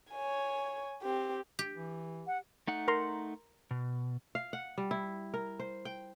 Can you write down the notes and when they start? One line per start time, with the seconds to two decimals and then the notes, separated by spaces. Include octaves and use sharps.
0.11 C#5 G#5
1.03 C4 G4
1.59 G4
1.76 E3
2.27 F#5
2.67 A3 D#4 F#5
2.88 A#4 A#5 C6
3.71 B2
4.35 F5
4.53 F#5
4.78 G3
4.91 E4
5.34 A#4
5.59 C5
5.85 G5